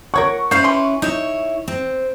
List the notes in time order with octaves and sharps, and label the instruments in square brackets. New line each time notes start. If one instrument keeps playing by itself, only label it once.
[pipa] A#4 C#5 F#5 [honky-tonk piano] C#6
[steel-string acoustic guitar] C#4 E4 B4 [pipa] C5 F5
[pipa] E3 C6
[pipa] D#4 [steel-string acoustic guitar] E4 C#5
[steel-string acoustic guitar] C4